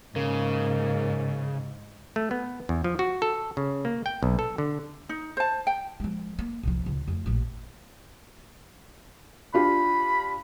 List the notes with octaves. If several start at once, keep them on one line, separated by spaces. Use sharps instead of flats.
G#2 C#3 A#3
A3
B3
E2
F3
F#4
A4
C#3
A#3
G5
B1
A4
D3
D#4
C5 A5
G5
F3 G#3
A#3
C2 F3
C#2
F2 A3
A1 A#2
D4 F4 G4 B5